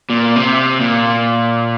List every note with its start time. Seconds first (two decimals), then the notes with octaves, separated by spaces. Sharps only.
0.10 A#2
0.36 C3
0.80 A#2